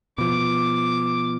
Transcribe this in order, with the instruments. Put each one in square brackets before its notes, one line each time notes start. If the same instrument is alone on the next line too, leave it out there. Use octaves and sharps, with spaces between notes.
[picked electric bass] B2 F3 [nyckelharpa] D6